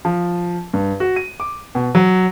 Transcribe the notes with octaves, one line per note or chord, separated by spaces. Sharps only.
F3
G2
F#4
D#7
D6
B2
F#3